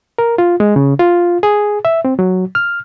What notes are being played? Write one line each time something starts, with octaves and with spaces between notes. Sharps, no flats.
A#4
F4
G#3
C#3
F4
G#4
E5
C4
F#3
F6